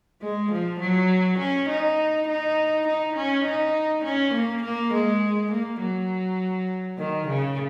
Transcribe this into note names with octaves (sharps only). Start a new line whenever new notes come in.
G#3
F3
F#3
C#4
D#4
D#4
D#4
C#4
D#4
C#4
A#3
A#3
G#3
A#3
F#3
D#3
C#3